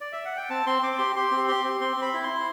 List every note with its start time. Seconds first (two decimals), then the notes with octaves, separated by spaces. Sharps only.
0.00 D5
0.12 E5
0.25 F#5
0.37 G5
0.50 C4 A5
0.66 C4 C6
0.82 C4 D6
0.98 G4 C6
1.16 G4 C6
1.31 C4
1.48 G4 C6
1.64 C4
1.80 C4 C6
1.97 C4
2.02 B5
2.14 E4
2.24 C6
2.29 E4